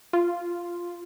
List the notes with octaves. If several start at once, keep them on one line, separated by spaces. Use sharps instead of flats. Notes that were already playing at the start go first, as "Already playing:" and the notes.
F4